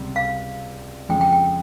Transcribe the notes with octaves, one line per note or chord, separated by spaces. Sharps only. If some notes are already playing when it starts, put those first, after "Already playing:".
Already playing: C#2 C3 G3
F5
F2 C#3 G#3 G5
G5
G5